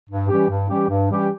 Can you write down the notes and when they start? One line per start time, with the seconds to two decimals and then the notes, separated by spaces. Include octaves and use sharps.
0.10 G2
0.28 E3 G3 C#4 G4
0.49 G2
0.69 E3 G3 C#4 G4
0.88 G2
1.08 E3 G3 C#4 G4